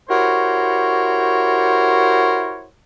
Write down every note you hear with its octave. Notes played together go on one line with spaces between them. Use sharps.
E4 F#4 G4 A#4 C5 C#5